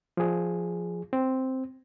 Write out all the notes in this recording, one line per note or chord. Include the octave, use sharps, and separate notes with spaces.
F3 G#4
C4